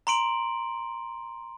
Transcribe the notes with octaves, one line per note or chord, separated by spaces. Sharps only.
A#5 C6 D7 F#7